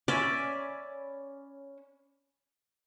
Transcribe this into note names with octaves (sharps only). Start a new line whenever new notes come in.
C#4 D5 E5 B5